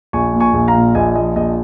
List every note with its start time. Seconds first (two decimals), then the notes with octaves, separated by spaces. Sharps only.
0.13 A#1 G#5 C#6
0.33 A#2
0.40 G#5 C#6
0.54 A#1
0.68 F5 A#5
0.75 A#2
0.95 A#1 D#5 G#5
1.16 F3 D#5
1.36 A#1 D#5